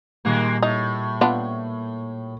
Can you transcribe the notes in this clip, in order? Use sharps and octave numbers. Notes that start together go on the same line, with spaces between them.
A#2 D#3 G3 G#3 A#3
A2 D#4
B3 D4 F4